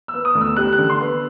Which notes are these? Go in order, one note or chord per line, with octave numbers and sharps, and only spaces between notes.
E6
B3
D#6
D2
E6
G3 F#6
F#6
D3
C6
B3